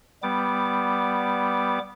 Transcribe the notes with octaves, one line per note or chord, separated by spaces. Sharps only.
G3 B3 D6